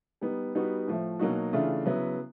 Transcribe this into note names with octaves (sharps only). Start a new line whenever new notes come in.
G3 B3 D#4
G3 B3 D#4 F#4
A2 F3 A3
B2 F#3 A#3 D#4 F#4
C#3 E3 A3 D4 F4
C#3 F#3 B3 E4